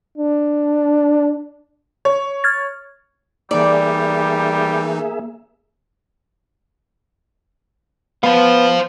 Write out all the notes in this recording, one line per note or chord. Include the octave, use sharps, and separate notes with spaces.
D4
C#5
F6 G#6 A6
E3 G3 A#3 D#4 G#4 D5 E5
B3 C5 F5